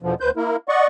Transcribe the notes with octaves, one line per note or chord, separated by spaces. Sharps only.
E2 B2 D3 F3
D2 B4 C5 G6
A#3 E4 A#4
D5 D#5 F#5 C#6